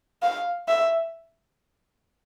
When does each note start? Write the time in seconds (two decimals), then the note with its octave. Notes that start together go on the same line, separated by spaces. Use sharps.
0.22 F5
0.68 E5